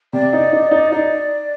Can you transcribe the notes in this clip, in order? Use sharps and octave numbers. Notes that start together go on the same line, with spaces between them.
C3 D5
D#4
D#4
D#4
D#4 D5